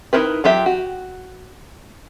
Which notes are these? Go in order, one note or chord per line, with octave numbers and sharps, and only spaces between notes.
D#4 E4 F#4 A#4 B4
F#3 F4 G4 E5
F#4